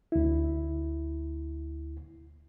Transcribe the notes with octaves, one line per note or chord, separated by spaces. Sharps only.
D2 E4